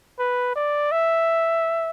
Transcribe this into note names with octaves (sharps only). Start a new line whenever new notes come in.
B4
D5
E5